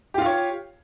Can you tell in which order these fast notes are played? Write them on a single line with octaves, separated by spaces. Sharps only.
G4 F4 F5 C#5